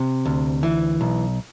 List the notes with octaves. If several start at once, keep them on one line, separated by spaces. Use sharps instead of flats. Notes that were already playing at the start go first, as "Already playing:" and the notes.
Already playing: C3
D2
E3
B1